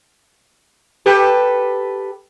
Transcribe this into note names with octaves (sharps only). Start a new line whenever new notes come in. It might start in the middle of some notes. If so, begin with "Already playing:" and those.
G4 A4 B4